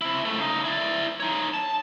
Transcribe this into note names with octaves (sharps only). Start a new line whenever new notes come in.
C3 E4
C#2 A3
C#3 D#4
E4 D5
D#4 C#5
A5